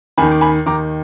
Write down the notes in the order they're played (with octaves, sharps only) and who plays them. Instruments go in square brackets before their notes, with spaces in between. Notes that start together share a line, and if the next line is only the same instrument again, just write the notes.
[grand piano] D#2 G#5 B5
D#3
D6
G#5 B5
D#2 D#3 A#5 D6